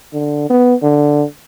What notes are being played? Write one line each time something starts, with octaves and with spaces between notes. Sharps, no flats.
D3
B3
D3